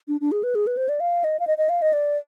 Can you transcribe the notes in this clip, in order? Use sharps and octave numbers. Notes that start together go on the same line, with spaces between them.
D4
D4
G#4
B4
G#4
B4
C5
D5
F5
D#5
F5
D#5
D#5
F5
D#5
D5